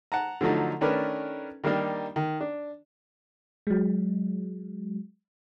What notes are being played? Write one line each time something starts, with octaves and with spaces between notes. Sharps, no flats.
F#5 A5 A#5
D3 F3 F#3 A3 D#4
D#3 A3 C#4 D4 A#4 B4
D#3 G3 A#3 D4 D#4
D#3
D4
F#3 G#3